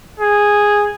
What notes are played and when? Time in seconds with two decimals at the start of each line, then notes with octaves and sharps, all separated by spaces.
0.20 G#4